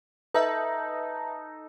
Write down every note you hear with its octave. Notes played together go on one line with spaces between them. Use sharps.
D#4 A4 B4 E5 A5